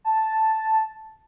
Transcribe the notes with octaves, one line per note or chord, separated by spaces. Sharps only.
A5